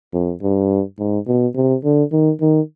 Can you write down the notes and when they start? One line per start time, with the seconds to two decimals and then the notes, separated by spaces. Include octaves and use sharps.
0.13 F2
0.42 G2
0.99 G#2
1.27 B2
1.55 C3
1.84 D3
2.12 D#3
2.41 D#3